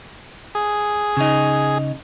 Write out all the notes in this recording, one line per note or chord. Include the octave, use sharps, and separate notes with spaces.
G#4
C#3 D#4